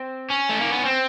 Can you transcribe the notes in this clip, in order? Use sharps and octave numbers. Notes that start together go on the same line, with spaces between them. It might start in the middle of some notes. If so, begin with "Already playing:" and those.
Already playing: C4
C#4
A3
A#3
B3
C4